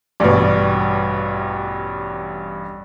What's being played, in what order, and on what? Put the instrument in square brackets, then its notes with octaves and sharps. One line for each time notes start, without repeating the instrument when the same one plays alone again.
[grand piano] A1 G2 [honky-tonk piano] B2 D5